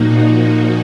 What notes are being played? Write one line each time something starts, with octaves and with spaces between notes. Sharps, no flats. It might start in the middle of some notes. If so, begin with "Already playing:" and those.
Already playing: A#2 F3 A#3 D#4 F#4